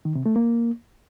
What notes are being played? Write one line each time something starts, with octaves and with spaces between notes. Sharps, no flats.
D#3
C3
A3
A#3